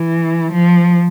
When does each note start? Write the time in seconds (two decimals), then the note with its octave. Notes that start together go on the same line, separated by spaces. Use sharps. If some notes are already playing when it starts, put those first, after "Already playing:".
Already playing: E3
0.52 F3